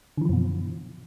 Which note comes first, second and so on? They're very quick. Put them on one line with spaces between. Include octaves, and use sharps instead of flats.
D3 E3 F3 F#2 B2